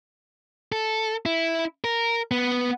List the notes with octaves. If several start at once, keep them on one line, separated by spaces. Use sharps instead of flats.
A4
E4
A#4
B3